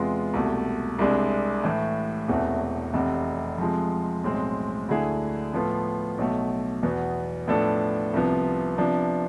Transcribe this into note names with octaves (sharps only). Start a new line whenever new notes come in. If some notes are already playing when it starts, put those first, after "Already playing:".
Already playing: E2 C3 G#3 B3 F4
C2 B2 A3
C2 C3 G#3 D4
A2 E3 A3
E1 E2 C3 E3 A3
F1 E2 C3
F2 C3 F3 G#3
B1 A2 G#3 C4
D2 D3 A3 E4 G#4
A2 F3 B3 F4 A4
B1 B2 A3
E2 B2 B3
A2 F3 B3 D4 A4
C2 C3 F3 B3
C3 F3 B3 D4